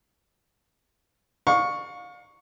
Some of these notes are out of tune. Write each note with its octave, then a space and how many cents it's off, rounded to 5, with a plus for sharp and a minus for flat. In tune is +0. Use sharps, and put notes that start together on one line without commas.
D5 +35 F5 +35 C#6 +0